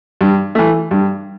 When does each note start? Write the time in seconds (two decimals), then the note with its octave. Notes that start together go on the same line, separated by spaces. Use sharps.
0.21 G2
0.55 E3 A3
0.91 G2